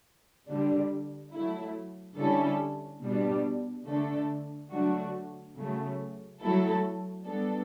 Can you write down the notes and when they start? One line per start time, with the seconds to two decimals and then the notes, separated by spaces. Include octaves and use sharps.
0.48 D3 G3 D4
1.33 F#3 A3 E4
2.17 D3 G3 C#4 E4 A4
3.02 B2 G3 D4
3.87 D3 A3 D4 A4
4.71 D3 F#3 A3 D4 F#4
5.56 C#3 F#3 A3
6.41 F#3 A3 E4 A4
7.26 G3 B3 D4 A4